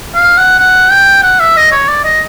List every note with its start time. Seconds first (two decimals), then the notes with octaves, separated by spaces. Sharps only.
0.15 F5
0.37 F#5
0.59 F#5
0.91 G5
1.23 F#5
1.40 E5
1.57 D#5
1.72 C#5
1.89 D5
2.04 D#5